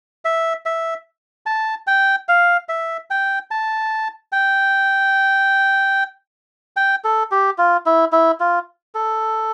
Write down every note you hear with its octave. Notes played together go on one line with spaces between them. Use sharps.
E5
E5
A5
G5
F5
E5
G5
A5
G5
G5
A4
G4
F4
E4
E4
F4
A4